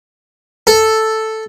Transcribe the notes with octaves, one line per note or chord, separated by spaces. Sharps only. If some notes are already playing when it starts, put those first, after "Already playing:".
A4